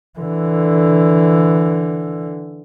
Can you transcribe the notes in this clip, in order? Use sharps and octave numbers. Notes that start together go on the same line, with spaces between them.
D3 E3